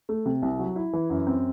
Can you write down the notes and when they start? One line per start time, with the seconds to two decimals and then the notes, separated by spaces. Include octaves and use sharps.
0.09 A3
0.26 C3
0.42 C2
0.59 F#3
0.76 E4
0.93 E3
1.10 F#2
1.27 C4